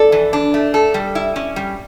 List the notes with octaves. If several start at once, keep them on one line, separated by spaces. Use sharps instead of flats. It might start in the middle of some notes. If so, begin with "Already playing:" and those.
Already playing: A4 D5
E3
D4
A3
A4
G3
E4
C#4
G3